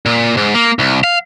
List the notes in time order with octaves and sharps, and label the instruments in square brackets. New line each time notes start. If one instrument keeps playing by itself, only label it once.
[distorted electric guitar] A#2
G#2
A#3
C2
F5